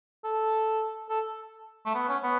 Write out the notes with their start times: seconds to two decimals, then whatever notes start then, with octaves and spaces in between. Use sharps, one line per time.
0.24 A4
1.10 A4
1.86 A3
1.95 B3
2.08 C#4
2.23 B3